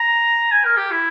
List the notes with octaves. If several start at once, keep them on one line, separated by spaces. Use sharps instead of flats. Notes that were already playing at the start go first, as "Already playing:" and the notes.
Already playing: A#5
G#5
A#4
G4
E4